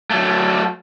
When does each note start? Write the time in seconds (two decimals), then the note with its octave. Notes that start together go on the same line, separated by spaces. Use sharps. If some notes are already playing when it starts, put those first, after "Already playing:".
0.10 F#3 A3